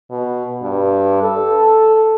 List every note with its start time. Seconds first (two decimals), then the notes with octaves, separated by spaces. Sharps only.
0.11 B2
0.63 G2
1.22 A4